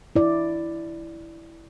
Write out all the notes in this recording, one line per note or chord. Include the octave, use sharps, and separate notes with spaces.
E4 D5